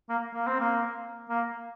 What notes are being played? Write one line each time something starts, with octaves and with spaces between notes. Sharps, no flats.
A#3
A#3
C4
A#3
A#3